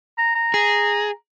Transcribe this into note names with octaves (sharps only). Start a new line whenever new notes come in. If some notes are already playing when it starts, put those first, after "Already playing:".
A#5
A#5
G#4